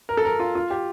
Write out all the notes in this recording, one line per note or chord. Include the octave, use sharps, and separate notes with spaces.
A#4
A4
A#4
F4
F4
G4